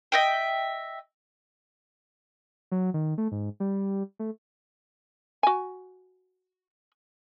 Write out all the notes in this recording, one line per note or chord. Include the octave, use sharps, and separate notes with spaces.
D#5 E5 G5
F#3
D#3
A3
G#2
G3
A3
F#4 G#5